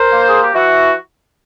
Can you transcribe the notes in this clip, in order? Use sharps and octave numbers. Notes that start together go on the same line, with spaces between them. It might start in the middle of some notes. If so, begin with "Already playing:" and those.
Already playing: A#4 C5
A#3
G#4
G4
E3 E4 F#4